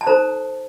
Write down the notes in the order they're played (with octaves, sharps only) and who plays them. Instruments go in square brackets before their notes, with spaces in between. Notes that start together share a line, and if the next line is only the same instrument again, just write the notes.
[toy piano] A5
D#4 A4 C5 A#5